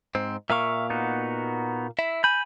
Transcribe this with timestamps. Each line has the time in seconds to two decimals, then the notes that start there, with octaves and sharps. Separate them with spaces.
0.15 G#2 C4
0.50 A#2 A#3 E5 F5 C#6
0.90 B3 D#4 F#4
1.99 E4 E5
2.24 G#5 B5 G6